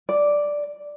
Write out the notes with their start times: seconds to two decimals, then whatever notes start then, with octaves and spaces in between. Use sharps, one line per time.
0.09 D5